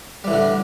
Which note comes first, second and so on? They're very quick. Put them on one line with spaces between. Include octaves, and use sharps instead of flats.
G3 E3 A2 D3